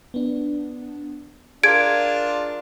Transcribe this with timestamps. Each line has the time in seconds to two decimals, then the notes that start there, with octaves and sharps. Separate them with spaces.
0.14 B3 D4
1.64 D4 F4 G#4 A#4 G#6 D7